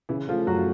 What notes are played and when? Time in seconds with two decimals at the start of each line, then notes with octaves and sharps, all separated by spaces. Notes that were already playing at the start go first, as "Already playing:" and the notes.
0.09 C#3 E3 E4
0.28 F3 A3 F4
0.47 F#2 F#3 F#4